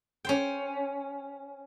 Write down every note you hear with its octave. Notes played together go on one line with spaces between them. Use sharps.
C#4 C5 G5